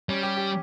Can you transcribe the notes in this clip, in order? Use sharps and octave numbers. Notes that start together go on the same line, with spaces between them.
G3 C#4
G4
G4